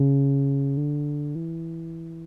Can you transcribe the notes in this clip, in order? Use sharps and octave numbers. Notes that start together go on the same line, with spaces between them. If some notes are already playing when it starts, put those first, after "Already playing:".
Already playing: C#3
D3
E3